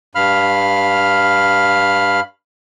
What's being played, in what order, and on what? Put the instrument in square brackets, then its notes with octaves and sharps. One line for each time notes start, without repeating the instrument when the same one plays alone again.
[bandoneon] G2 F5 B5 F6